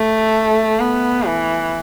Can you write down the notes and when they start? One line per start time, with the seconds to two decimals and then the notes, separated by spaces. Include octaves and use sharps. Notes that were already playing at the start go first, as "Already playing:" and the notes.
Already playing: A3
0.80 B3
1.27 E3